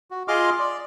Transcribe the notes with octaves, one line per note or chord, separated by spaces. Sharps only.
F#4
F4 G#4 D#5 C6 D6 F6
D5